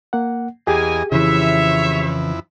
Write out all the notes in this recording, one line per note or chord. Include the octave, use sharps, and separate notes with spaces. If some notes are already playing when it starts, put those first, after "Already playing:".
A#3 F#5
E2 A#3 G4 G#4 D#5 G#5
F2 C#3 E3 E4 C#5 E5